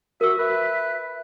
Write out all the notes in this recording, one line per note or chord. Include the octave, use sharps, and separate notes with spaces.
F#4 A#4 E5 E6
B4 E5